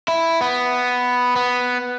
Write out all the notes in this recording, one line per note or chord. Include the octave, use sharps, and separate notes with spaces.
E4
B3
B3